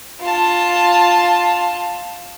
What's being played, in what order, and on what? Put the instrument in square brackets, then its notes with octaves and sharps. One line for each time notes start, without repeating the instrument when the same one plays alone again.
[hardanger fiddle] F4 A5